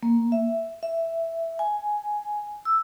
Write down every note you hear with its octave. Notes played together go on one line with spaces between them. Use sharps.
A#3
E5
E5
G#5
E6